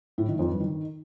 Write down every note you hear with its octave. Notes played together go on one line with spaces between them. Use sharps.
A2
D#3
F2
G2
D#3